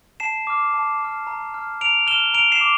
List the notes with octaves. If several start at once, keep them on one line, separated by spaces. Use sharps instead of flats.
A5 C7 E7
D6 F6
A5
D6 F6
A#5
F6
A#5 D7 F7
F6 E7 G7
A#5 D7 F7
C7 E7
D6